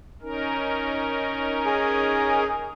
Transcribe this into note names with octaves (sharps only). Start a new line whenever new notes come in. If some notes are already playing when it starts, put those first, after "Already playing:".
C#4 D#4 A#4
G#4